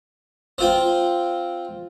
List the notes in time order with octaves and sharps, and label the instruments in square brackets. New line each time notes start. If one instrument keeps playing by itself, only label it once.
[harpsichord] C4 F4 G5